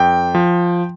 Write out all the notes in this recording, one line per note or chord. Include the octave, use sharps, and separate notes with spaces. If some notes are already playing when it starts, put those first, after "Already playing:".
Already playing: F2 G5
F3